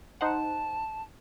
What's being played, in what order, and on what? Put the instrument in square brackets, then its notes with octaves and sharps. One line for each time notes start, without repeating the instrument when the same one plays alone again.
[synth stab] D#4 C5 F#5 [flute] A5